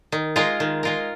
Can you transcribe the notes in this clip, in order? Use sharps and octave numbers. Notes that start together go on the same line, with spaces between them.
D#3
G#3 F4 A#4
D#3
G#3 F4 A#4